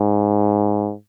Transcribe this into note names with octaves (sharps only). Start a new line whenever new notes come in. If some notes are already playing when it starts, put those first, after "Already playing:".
Already playing: G#2